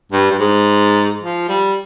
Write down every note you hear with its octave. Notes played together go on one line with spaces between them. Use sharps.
G2
G2
G#2
F3
G3